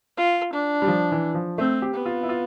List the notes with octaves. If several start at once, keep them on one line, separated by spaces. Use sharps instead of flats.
F4
D4
G3
F3
E3
F3
A3 C4
G4
B3
F4
E4
F4